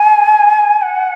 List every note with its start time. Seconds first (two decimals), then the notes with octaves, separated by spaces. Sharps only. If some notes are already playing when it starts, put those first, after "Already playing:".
Already playing: G#5
0.81 F#5